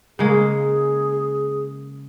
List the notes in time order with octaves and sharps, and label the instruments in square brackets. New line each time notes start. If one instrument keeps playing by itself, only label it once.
[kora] C#3 G#3 A#3 [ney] G#4